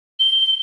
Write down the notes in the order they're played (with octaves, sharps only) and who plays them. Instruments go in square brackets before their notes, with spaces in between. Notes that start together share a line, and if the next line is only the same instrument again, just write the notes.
[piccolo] G7